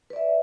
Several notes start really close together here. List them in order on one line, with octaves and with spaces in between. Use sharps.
B4 D5 E5